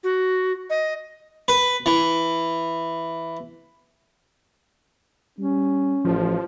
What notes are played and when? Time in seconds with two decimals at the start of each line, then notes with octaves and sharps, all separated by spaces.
0.04 F#4
0.70 D#5
1.48 B4
1.86 E3
5.39 G3 C#4
6.05 A1 F3